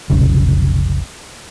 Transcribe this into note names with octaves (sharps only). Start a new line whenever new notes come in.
F1 B1 C#3